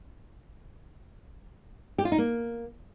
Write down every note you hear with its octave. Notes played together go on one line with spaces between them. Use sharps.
G4
F4
D#4
A#3